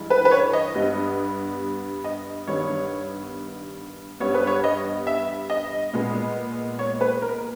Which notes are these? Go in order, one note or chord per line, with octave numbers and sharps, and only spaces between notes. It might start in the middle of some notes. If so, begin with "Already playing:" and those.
Already playing: G2 E3 G#3
B4
B4
C#5
D#5
G2 G3 B3
D#5
G2 D#3 G3 B3 C#5
G2 G3 B3 C#5
B4
C#5
D#5
E5
D#5
A#2 G#3 B3
C#5
B4
A#4